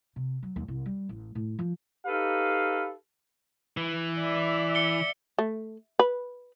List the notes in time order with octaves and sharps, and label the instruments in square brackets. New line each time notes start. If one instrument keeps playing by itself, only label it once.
[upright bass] C3
F#3
D#2
C2
G3
A1
A2
F3
[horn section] D#4 G4 A4 B4 F5
[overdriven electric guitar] E3
[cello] D5 E5
[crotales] C#7 G7
[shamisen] A3
B4